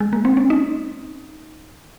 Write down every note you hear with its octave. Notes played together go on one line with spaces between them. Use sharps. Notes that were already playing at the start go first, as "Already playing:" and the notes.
G#3
A#3
C4
C#4
D#4